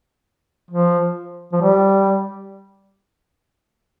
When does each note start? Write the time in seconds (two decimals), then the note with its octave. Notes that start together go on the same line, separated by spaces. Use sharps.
0.71 F3
1.53 F3
1.61 G3